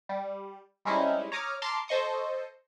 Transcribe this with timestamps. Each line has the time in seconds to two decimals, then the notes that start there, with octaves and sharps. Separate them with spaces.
0.09 G3
0.85 G3 G#3 C4 C#4 D#4 E4
1.32 C#5 A#5 D6 D#6 F6
1.62 A5 A#5 C6 D6 F6
1.88 A4 C5 D#5 C#6 D#6